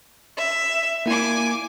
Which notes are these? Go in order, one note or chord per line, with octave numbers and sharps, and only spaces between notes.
E5
A#3 E4 G#5 D6